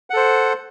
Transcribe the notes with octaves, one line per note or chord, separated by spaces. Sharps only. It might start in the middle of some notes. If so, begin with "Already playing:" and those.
A4 C5 F#5